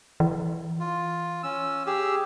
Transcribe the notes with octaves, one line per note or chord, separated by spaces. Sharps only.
E3
F4
C#4 E6
G4 G#4 E6